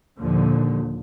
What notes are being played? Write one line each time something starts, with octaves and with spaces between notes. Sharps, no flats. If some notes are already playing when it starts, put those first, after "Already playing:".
D#2 A#2 D3 F3